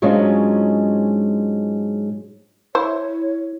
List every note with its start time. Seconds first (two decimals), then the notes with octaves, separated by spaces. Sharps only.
0.02 G#2 F#3 G#3 C#4 D4 F4
2.75 E4 C5 C#5